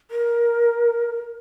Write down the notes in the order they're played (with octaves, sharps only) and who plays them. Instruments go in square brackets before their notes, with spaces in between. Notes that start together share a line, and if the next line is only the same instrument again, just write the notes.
[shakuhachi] A#4